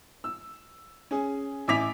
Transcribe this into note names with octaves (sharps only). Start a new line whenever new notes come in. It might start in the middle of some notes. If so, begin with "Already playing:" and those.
E6
C#4 G#4
A1 E4 G#5 D6 B6 F7